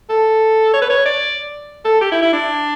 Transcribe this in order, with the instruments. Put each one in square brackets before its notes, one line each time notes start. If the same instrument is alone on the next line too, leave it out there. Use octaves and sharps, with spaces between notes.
[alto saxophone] A4
C#5
B4
C#5
D5
A4
G4
E4
E4
D4